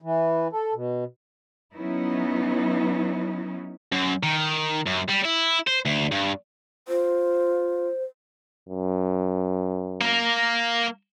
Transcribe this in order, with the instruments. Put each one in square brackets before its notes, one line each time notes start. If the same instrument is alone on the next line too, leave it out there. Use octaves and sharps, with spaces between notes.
[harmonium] E3
A4
B2
[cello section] F#3 B3 C#4 D#4 E4
[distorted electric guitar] F#2
D#3
F#2
G3
E4
C5
D2
G2
[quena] F4 [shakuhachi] C5
[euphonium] F#2
[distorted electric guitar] A#3 A#4